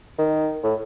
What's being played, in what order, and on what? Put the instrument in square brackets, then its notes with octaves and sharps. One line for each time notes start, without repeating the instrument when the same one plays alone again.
[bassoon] D#3
A2